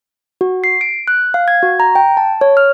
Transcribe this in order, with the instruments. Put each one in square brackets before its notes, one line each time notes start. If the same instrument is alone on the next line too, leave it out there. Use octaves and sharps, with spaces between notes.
[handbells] F#4
C7
D7
F#6
F5
G#6
F#4
A#5
G5
A5
C#5
F6